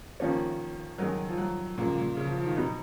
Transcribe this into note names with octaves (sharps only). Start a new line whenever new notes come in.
D#3 F3 A#3 C#4
D#3 F#3 G#3 D#4 A#4
F3
F#3
C#2 A#2 C#3 F3 A#3 F4
A#2
C#3
F3
F3
D#3
B2 F#3 B3 D#4